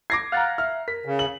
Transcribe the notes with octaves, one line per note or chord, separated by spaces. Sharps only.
D6 G#6 A#6 C7
F5 F#5 A#5 F6 F#6 A6
E5 F6
A#4 B6
C#3
F#7